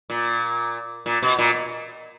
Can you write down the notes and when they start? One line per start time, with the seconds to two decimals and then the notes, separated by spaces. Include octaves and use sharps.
0.10 A#2
1.06 A#2
1.22 B2
1.38 A#2